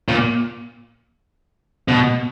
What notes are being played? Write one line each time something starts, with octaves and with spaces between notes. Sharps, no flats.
A#2
B2